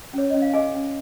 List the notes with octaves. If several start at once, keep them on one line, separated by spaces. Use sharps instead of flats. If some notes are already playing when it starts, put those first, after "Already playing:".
C#4 C#5
C#4 D#5
F5
G#4 D#5 G#5
C#4